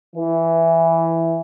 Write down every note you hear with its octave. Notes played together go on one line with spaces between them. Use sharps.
E3